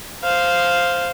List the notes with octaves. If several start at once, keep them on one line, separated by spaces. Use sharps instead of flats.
C5 F5